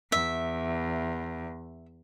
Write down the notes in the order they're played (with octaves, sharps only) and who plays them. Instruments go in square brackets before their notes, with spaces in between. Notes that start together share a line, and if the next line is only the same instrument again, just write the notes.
[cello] E2 [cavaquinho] E5